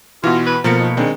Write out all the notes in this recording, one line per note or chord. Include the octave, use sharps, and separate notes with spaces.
B2 E3 F4 F#4
B4
B2 F3 A3 A#3 A#4 C#7
D#4
D#3 G#3 C4 D4